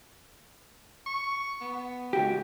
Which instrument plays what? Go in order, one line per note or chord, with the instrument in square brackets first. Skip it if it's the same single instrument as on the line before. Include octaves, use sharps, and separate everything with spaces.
[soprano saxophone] C#6
B3
[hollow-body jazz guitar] C#2 F#4 G4